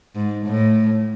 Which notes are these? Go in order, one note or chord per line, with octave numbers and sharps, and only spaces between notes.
G#2
A2